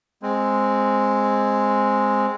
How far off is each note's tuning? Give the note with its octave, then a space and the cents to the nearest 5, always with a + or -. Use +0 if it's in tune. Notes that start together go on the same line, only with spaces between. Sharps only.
G#3 +0 C4 +5